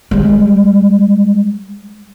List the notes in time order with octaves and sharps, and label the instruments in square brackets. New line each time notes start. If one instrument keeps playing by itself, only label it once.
[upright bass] G3 G#3